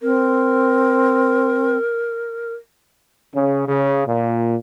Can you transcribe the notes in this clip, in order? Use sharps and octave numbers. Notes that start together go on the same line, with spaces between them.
C4 A#4
C#3
C#3
A#2